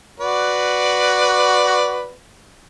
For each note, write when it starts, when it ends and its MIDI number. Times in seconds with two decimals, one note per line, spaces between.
0.20 2.12 66
0.20 2.12 71
0.20 2.12 74